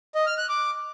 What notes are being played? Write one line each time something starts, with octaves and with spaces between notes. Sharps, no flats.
D#5
F6
F#6
D6